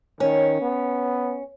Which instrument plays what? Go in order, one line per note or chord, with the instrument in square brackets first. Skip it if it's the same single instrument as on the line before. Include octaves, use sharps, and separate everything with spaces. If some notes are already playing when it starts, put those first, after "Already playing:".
[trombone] D#3 [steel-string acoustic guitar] C#4
[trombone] B3